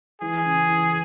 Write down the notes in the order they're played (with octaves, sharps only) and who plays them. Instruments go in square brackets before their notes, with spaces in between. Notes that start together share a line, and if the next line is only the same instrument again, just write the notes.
[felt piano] E3 [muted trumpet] G#4
[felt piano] C#3
E3